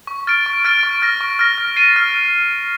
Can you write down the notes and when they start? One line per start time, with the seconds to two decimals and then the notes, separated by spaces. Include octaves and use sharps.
0.07 C#6
0.27 F6 A6 D7
0.46 C#6
0.65 F6 A6 D7
0.83 C#6
1.02 F6 A#6
1.21 C#6
1.39 F6 A#6
1.58 F6
1.76 A6 C7 D#7
1.96 F6